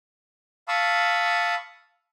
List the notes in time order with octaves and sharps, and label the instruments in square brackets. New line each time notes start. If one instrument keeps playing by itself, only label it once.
[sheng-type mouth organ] F5 A5 B5 C#6 D#6 E6